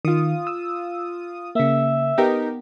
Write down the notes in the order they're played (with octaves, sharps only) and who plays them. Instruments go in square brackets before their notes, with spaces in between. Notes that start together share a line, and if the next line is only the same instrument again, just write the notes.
[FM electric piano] D#3 [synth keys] F4 D#6
[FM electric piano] E6
[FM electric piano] C#3 A#3 [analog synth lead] E5
[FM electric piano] B3 [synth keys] D#4 G4 A#4